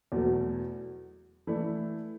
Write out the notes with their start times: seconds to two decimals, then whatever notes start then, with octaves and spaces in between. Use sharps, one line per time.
0.12 E2 B2 F#3 A3
1.47 E3 A3 E4 D5